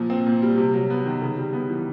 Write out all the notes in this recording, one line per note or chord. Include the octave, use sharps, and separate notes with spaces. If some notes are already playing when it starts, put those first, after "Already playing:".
Already playing: A#2 F3
C4
A#2
G3
C3
F#3
B3
D#3
C#3
G3
B3
E3